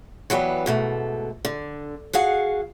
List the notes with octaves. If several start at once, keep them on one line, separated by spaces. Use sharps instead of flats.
E3 F#3 G3 B3
G#2 B2 A3
D3
F#4 G#4 F5 F#5